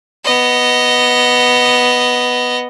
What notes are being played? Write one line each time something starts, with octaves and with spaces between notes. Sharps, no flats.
B3 D#5